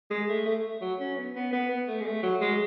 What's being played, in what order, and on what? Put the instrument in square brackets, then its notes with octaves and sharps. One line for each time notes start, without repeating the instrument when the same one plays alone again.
[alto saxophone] G#3
A3
A3
F#3
C#4
B3
B3
B3
B3
A3
G#3
A3
F#3
G#3